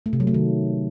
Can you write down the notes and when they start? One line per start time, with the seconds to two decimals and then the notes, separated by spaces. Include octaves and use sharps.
0.06 A3
0.13 C3
0.20 F#3
0.27 A3
0.34 D#3